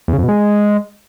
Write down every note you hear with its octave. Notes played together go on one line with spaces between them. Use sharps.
E2
C#3
F2
B2
G#3